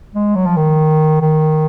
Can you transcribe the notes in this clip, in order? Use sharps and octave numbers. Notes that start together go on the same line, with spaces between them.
G#3
F#3
F3
D#3
D#3